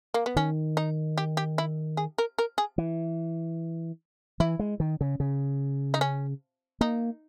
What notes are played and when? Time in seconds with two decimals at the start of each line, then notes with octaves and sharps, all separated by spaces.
0.14 A#3
0.26 B3
0.36 D#3 C#4
0.77 D#4
1.18 G4
1.37 G4
1.58 E4
1.97 G#4
2.18 A#4
2.38 A#4
2.58 G#4
2.78 E3
4.40 E3 E4
4.59 G#3
4.80 D#3
5.01 C#3
5.20 C#3
5.94 D#4
6.01 C#4
6.81 A#3 D#4